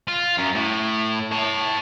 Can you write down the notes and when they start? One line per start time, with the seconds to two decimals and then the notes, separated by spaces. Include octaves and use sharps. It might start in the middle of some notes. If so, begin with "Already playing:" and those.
0.08 F4
0.38 F#2
0.55 A2
1.31 C#5 A5